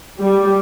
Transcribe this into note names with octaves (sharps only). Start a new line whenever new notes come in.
G3